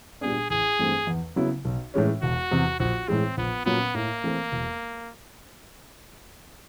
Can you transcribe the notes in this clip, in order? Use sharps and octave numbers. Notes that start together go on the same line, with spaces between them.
A#2 G3 B3 D4 G#4
A1 G#4
G2 E3 A3 C4
E2
C#3 F#3 B3 E4
B1
A2 E3 G#3 C#4
E1 F#4
E2 C3
A#1 F#4
A2 E3 G#3 C4
A#1 B3
A#2 F#3 A#3 B3 C#4
A2 A#3
E3 A3 C4
E1